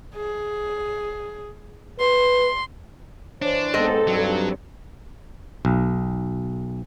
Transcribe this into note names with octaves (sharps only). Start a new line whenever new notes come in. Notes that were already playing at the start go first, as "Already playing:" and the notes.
G#4
B4 C6
E3 D4 C5 C#5
D#2 G#2 B3 C4 D#4 A4 D#5
G2 F#3
B1